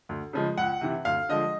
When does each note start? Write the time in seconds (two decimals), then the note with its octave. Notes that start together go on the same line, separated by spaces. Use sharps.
0.09 D2
0.33 C#3 F3 G#3
0.58 C#2 F#5
0.81 C3 E3
1.05 D2 F5
1.29 D3 F3 G#3 D#5